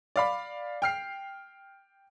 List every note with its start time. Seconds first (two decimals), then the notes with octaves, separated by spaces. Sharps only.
0.16 D5 F5 B5
0.82 G5 F6 C7